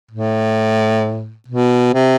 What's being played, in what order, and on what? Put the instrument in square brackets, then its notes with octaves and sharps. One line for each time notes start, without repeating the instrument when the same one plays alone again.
[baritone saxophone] A2
B2
C3